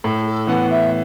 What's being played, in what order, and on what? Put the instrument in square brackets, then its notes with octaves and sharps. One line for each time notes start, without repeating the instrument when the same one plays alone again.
[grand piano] A2 [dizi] A4
[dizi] A4
[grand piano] E3 B3 [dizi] F#5
[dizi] E5